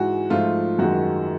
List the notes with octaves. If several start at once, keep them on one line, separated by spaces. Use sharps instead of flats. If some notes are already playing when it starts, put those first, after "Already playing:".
Already playing: G#2 E3 G#3 F#4
G#2 F3 A3 F4
F#2 D#3 G#3 F#4